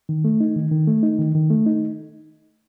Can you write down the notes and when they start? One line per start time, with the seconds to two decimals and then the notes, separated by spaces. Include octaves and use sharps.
0.09 D#3
0.25 A3
0.40 D#4
0.56 D#3
0.71 D#3
0.87 A3
1.03 D#4
1.19 D#3
1.35 D#3
1.50 A3
1.66 D#4